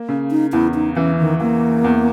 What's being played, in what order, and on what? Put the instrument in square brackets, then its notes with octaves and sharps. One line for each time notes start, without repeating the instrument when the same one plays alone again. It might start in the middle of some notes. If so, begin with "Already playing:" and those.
Already playing: [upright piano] A#3
C#3
[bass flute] D#4
[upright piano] E2 [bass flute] E4
[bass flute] D#4
[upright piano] E3 [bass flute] C#4
[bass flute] D#3
[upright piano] E3 [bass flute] A#3
[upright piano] E2